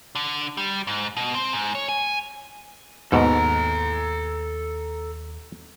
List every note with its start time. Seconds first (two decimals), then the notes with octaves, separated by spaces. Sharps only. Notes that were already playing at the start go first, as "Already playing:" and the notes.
0.15 D3
0.57 G3
0.87 G#2
1.17 B2
1.35 C4
1.53 G#2
1.75 C#5
1.89 G#5
3.12 D#2 G#2 B2 A4 A#5